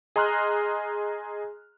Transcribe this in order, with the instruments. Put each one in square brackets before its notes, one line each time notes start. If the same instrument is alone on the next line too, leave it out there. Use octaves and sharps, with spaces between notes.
[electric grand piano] G#4 D#5 A#5 C6 F6 F#6